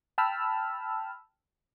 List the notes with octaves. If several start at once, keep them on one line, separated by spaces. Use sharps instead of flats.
G5 A5 B5 E6 F6